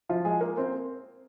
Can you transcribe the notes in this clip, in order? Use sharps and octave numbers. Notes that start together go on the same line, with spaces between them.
F3 F4
G#3 G#4
A#3 A#4
C4 C5